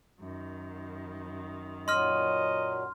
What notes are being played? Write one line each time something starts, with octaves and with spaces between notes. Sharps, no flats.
F#2 D#3
A#2 F#3 D#5 C6 F6